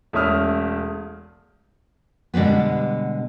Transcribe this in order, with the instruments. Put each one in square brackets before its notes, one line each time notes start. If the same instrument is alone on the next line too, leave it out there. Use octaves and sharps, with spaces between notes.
[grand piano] E1 A3 C#4 E5 D#6 F6
[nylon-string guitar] B2 D3 G3 G#3 B3